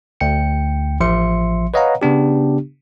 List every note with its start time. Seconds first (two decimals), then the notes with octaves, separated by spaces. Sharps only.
0.21 D2 G5 C#7
1.00 A1 F3 E5 C6 C#7
1.74 B4 C#5 D#5 F5 F#5 A#5
2.02 C#3 B3 D4 G4